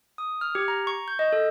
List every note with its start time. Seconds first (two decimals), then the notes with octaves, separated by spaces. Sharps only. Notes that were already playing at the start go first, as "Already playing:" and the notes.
0.18 D#6
0.41 F6
0.55 G4
0.68 A#5
0.87 C#6
1.08 G6
1.19 D#5
1.33 A4